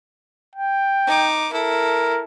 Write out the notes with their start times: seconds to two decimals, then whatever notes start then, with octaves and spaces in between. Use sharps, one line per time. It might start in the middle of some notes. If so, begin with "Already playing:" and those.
0.56 G5
1.07 D#4 D6
1.53 E4 A4 A#4